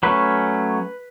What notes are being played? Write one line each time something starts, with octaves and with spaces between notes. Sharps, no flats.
F#3 A3 C#4 B4